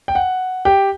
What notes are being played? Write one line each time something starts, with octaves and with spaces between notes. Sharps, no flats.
G5
F#5
G4 G5